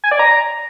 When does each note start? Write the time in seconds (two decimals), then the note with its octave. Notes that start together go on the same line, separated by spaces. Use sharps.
0.04 G#5
0.11 D5
0.19 A#5